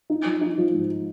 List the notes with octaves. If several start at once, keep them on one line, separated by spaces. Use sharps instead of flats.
D#4
F3
D#4
F3
G#2